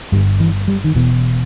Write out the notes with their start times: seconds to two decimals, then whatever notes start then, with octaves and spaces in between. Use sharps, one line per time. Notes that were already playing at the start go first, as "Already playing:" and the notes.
0.12 G1 G2 G3
0.40 E3
0.68 G3
0.84 D#3
0.95 E1 E2 B2 E3